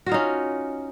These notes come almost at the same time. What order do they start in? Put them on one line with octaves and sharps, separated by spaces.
F#4 F4 D#4 C#4